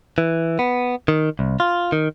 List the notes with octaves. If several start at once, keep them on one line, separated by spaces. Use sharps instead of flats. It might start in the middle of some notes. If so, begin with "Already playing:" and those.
E3
B3
D#3
C2
F4
D#3